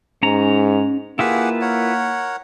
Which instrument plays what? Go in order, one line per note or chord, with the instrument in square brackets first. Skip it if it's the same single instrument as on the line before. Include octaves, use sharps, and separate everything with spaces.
[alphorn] G#2 [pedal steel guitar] C#4 A#5
[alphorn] A#3 [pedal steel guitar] E4 F4 B4 [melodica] G4 G#4 F#5
[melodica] A#4 C#5 F#5